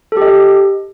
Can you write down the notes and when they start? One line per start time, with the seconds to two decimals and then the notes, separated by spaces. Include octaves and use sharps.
0.12 A4
0.17 G4
0.22 D#5